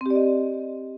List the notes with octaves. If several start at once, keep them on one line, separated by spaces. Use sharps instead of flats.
C4 G4 D5 D#5